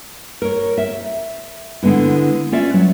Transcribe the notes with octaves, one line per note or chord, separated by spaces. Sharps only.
A#4 C#5
E5
D3 G#3 B3 E4
C#4 F4 D5 E5
F#3